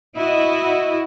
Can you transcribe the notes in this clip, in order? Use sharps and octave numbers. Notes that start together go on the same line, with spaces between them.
E4 F#4 D#5